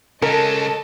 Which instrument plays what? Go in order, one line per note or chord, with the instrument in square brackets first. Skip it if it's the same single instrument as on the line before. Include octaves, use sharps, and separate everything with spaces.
[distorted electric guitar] C#3 G#3 [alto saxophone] A4 [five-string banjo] A#4 [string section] D#5 A5